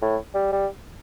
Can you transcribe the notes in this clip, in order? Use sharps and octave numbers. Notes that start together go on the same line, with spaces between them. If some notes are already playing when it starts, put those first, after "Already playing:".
A2
G3
G3